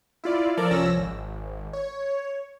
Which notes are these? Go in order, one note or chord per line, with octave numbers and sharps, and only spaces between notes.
E4 F4 D5
F3 A4 A#4 D5
C2 F3 C#4 E6 A#6
G#1
C#5